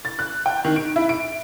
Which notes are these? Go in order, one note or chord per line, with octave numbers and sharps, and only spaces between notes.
A6
F#6
G5
D#3
D7
E4
D7